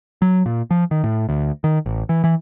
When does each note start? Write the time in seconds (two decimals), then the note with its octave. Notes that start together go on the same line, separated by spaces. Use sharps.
0.22 F#3
0.46 A#2
0.71 F3
0.91 D#3
1.04 A2
1.29 D2
1.64 D#3
1.86 A1
2.09 E3
2.24 E3